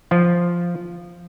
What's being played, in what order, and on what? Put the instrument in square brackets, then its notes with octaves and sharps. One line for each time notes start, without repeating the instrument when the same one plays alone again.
[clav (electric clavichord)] F3 F4